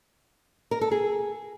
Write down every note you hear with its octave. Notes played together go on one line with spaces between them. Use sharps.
A#4
A4
G#4